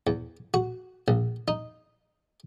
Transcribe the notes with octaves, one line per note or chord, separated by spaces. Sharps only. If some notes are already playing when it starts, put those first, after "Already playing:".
E2
F#4
A#1
D#4